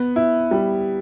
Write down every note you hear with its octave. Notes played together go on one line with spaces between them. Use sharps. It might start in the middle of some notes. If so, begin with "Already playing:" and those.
Already playing: B3
E4
G3